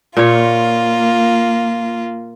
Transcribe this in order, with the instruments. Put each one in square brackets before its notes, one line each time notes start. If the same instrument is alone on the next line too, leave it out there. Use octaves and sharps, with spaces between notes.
[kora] A#2 C#5 [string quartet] A#3 F4